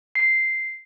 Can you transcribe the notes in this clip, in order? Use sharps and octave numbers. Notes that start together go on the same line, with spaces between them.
C7